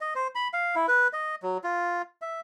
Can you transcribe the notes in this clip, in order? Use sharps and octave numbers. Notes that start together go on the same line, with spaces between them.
D#5
C5
B5
F5
E4
B4
D#5
F#3
F4
E5